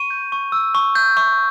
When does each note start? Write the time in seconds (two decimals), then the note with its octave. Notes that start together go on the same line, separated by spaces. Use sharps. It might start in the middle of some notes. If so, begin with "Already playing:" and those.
Already playing: C#6 D#7
0.10 G6
0.32 C#6
0.52 E6
0.75 C#6
0.95 G6
1.17 C#6